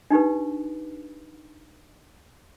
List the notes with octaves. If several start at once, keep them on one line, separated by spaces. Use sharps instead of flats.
D4 D#4 G4 B4